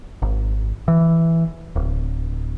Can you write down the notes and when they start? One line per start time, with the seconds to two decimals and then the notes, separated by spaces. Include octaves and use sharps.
0.22 G#1
0.88 E3
1.76 D1